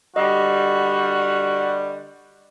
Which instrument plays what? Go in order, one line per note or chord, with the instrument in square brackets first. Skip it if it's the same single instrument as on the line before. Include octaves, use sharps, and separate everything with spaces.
[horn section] D3 G3 [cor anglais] F#4 [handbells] D#5